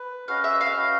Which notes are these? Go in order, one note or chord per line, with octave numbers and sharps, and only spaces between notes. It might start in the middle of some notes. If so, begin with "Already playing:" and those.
Already playing: B4
C#4 F#4 B4 D#5 F5
E5
F5
C#4 F#4 B4 D#5